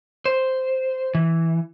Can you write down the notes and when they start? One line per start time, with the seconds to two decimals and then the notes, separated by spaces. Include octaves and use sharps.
0.26 C5
1.15 E3